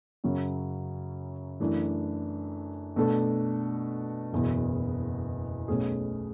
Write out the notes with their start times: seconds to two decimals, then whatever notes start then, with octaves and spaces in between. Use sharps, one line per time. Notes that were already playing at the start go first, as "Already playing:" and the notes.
0.24 F#2 C#3 F#3 C#4
1.60 F#2 E3 A3 D4
2.96 B2 A3 D4 A4
4.33 F#1 E2 B2
5.68 B1 B2 A3 C#4 G#4